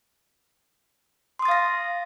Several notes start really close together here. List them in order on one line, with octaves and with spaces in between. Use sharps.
C6 D#6 A6 F5 A#6